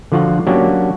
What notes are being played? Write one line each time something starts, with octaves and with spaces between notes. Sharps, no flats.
D3 F3 F4 F#4 F#5
F#3 A#3 C#4 D4 F#4 G4